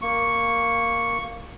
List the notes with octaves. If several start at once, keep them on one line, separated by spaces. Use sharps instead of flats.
A#3 C#6